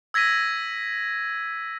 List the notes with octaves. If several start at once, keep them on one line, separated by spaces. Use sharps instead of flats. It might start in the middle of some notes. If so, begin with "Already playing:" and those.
E6 G#6 A#6 B6 D#7